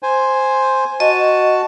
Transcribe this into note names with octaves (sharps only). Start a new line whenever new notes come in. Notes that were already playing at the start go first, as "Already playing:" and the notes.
C5 G#5
F#4 D#5 A5